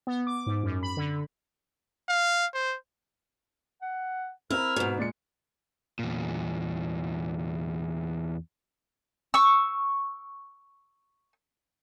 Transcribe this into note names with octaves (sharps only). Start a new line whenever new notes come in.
B3
D6
G#2
F#2
B5
D3
F5
C5
F#5
C4 E4 A#4 F6
G#2 B2
A#2 G#3 D5 C#7
E2 A#2
C#6 E6